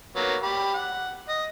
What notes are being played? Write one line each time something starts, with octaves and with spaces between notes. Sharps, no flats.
F#3 A#3 B3
G4 B5
F#5
D#5